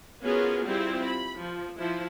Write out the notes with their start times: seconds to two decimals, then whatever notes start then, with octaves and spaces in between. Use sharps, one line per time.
0.23 B3 C#4 F4 F#4 G#4 A#4
0.66 G3 C4 E4 F4 G4 G#4
1.04 B5
1.37 F3
1.76 F3 E4